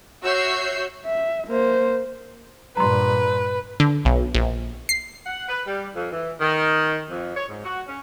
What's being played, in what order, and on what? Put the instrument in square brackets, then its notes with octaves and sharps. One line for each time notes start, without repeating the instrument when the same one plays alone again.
[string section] F#4 C#5 E5 E6 G6 C7
[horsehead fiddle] E5
A#3 C5
[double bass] G2 A#2 [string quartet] B4 [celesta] A#5 C6
[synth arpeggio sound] D3
B1
A#1
C7
[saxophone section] F#5
B4
G3
F2
E3
D#3
F2
C#5
G#2
F#4
C#4